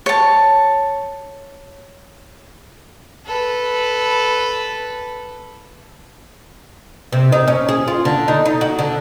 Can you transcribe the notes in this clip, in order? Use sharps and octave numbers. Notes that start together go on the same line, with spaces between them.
C#5 A5
A4 B4
C3
D#4
C#4
G#4
F4
D3
D#4
D#4
F#4
D3